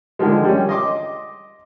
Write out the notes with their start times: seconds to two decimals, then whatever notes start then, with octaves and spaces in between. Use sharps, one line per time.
0.19 D3 D#3 F3 G#3
0.45 G3 C#4
0.69 D#5 C6 D6